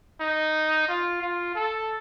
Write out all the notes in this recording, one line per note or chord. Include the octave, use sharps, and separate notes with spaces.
D#4
F4
F4
A4